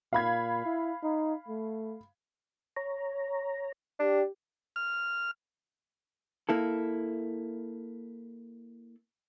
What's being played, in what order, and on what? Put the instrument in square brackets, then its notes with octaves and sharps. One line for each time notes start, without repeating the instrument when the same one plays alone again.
[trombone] A#2 [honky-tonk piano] F5 B5 G#6
[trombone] E4
D#4
A3
[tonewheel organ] C#5 A#5
[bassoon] D4 [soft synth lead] G4
[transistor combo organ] F6
[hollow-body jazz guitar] A#3 E4 A4